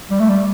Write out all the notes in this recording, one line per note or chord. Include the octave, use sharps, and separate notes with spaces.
G3
A3
G3